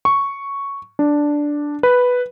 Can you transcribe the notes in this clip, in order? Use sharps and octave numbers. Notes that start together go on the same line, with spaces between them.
C#6
D4
B4